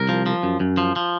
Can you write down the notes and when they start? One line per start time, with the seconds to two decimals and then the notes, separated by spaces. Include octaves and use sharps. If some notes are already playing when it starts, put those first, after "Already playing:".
Already playing: C2 A#4
0.09 F3
0.26 F3
0.43 F#2
0.60 F#2
0.77 F3
0.96 F3